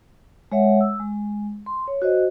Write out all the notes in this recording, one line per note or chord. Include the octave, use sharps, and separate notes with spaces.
G#3 C#5 E5 F#5
E6
G#3
C6
C#5
F#4 C5 D#5